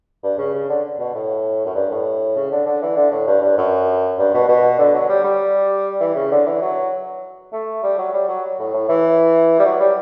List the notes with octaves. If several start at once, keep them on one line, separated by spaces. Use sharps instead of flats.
G2
C#3
C#3
D3
B2
A2
F#2
G2
A2
C#3
D3
D3
E3
D3
A2
G2
G2
F#2
G2
B2
B2
D3
F#3
G3
G3
E3
C#3
D3
E3
F#3
A3
G3
F#3
G3
F#3
A2
A2
E3
G3
F#3
G3